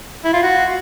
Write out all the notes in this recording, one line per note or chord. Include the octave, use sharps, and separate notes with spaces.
E4
F4
F#4